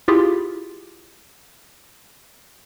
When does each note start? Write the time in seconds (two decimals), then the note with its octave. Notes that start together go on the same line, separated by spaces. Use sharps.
0.08 E4 F4 G4 G#4